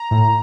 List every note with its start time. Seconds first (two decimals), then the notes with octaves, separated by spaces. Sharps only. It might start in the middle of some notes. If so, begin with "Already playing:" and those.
Already playing: A#5
0.11 A2